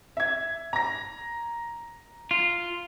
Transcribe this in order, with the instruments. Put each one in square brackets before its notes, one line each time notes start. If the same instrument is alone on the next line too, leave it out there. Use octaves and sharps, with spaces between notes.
[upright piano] E5 G#6
A#5 A#6
[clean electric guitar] F4